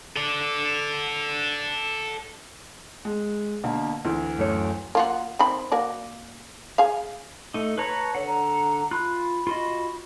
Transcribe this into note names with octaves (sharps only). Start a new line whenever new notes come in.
A4 D5
G#3
B2 D3 A#3
D2 E3
F#2 A3 C#5
A#3 F4 F#4
D#3 C4 B5
A#3 F#4 D5
G#4 F5
A3 D#4
B4 C#5 A5 A#5
D3 C#5 F#5
A#5
F4 B5 F#6
F4 F#4 D#5